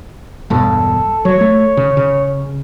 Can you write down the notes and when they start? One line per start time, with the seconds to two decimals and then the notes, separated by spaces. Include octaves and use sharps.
0.50 E1 G2 B2 A4
1.25 F#3 C#5
1.41 A3
1.77 C#3
1.97 C#3